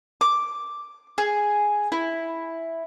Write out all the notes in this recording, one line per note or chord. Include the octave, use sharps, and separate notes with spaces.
D6
G#4
E4